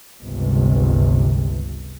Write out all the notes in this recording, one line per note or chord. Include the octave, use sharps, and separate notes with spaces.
G1 C#2 C3